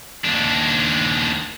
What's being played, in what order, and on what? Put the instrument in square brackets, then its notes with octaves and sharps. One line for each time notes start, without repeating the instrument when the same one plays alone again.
[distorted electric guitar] D#2 D4